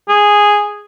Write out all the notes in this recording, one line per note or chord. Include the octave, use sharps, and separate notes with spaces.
G#4